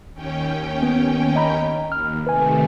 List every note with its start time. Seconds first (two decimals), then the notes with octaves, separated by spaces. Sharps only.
0.14 D#2 C#4 G5
0.83 B3
1.36 D#5 A#5 B5
1.92 D#2 F6
2.27 C3 D#3 A3 B4 G#5